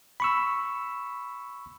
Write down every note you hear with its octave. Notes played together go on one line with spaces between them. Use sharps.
B5 C#6 E6